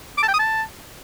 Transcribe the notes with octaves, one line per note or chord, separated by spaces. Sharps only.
D6
A5
G5
D#6
A5